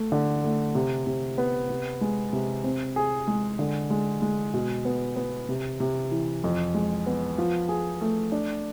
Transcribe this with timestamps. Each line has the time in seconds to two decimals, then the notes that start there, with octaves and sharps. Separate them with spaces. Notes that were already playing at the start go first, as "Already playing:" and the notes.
Already playing: A3
0.12 D3
0.44 A3
0.75 C3
1.07 C3
1.38 B3
1.70 C3
2.01 G#3
2.33 C3
2.64 C4
2.96 G#4
3.28 G#3
3.59 D3
3.90 G#3
4.22 G#3
4.54 B2
4.85 B3
5.16 B3
5.49 C3
5.80 C3
6.11 E3
6.44 F2
6.74 G#3
7.06 B3
7.38 F3
7.69 G#4
8.01 A3
8.32 D4